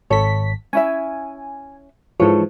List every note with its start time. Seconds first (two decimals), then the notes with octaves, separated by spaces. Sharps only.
0.10 G#1 A4 C#5 B6
0.73 C#4 E4 E5 G#5
2.20 G#2 E3 F3 A4 C#5